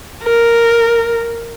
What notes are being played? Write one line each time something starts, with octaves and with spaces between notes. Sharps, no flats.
A#4